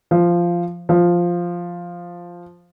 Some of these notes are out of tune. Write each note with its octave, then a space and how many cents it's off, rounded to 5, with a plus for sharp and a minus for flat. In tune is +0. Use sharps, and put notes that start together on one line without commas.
F3 -10
F3 +0